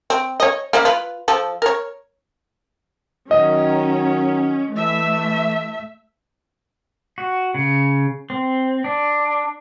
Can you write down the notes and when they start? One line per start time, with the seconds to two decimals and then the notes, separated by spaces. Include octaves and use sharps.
0.10 C4
0.40 C#5 D#5
0.73 A#3 C#4 E4
0.85 F4 B4
1.28 F3 A4
1.62 A#4 C#5
3.31 D#3 F#3 C#4 D#5
4.75 E3 A3 E5
7.18 F#4
7.54 C#3
8.30 C4
8.84 D4